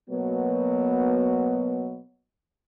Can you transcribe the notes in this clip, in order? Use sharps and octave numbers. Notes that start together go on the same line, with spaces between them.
B2 F#3 A#3 B3